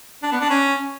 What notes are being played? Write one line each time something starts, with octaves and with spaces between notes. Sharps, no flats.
D4
B3
D4
C#4